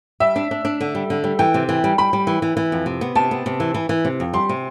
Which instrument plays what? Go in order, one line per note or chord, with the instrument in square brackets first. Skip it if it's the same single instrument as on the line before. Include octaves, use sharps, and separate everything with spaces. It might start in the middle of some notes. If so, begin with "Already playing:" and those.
[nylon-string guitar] G3 [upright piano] E5
[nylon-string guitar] D4
D4
D4
D3
G3
D3
G3
[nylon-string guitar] E3 [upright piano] G5
[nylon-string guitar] C3
E3
G3
[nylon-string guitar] G3 [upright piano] B5
[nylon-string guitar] G3
E3
E3
E3
F2
C3
B3
[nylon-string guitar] C3 [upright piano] A5
[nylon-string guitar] B3
C3
E3
E3
E3
C3
F2
[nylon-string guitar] G3 [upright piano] C6
[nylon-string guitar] C3